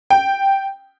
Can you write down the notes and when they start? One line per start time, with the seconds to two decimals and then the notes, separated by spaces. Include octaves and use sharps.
0.10 G5